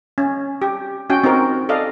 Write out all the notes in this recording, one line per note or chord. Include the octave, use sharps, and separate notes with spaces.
C#4
G4
C#4 F#4 G5
C4 D#4 F#4 A#4
A4 D5 D#5 F5